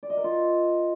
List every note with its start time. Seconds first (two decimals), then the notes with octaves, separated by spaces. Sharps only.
0.03 D5
0.10 D#5
0.17 A#4
0.24 F4